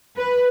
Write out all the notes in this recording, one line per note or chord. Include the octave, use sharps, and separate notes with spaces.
B4